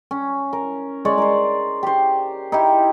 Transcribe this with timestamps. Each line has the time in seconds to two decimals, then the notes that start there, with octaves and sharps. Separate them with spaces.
0.11 C#4
0.53 A#4
1.05 G#3 C#5 D5
1.18 A#4 C5
1.83 G4 C5
2.52 D#4 E4 G4